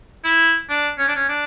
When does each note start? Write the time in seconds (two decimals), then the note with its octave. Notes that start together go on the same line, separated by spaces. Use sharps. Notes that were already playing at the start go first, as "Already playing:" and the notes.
0.24 E4
0.69 D4
0.98 C#4
1.08 D4
1.16 C#4
1.29 D4